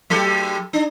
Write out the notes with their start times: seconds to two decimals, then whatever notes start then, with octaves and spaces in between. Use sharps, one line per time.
0.10 F#3 G4 A4
0.73 D4